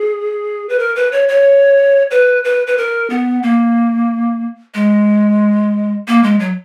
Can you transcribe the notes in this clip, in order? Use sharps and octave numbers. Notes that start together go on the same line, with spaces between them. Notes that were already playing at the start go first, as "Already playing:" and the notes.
Already playing: G#4
B4
A#4
B4
C#5
C#5
B4
B4
B4
A#4
B3
A#3
G#3
A#3
G#3
F#3